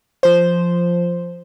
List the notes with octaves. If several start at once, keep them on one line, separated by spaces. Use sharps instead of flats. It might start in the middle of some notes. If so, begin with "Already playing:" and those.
F3 C5